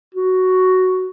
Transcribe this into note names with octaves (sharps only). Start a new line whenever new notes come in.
F#4